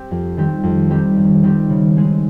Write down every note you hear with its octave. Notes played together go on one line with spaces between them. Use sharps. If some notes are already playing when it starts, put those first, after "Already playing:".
Already playing: C4 G4
F2
D#3 G3 C4 G4
F2
D#3 G3 C4 G4
F2
D#3 G3 C4 G4
C#3
G#3 C4 D#4 G#4